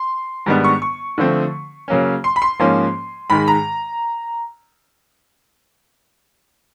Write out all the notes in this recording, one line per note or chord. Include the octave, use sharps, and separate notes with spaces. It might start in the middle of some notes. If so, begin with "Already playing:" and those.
Already playing: C6
G#2 D#3 G3 B3 D4
C#6
C#6
D3 F3 A3 C4
C#3 F#3 A#3 C#4
C6
B5
C6
G#2 F3 A#3 C#4
G#2 D#3 G#3 B5
A#5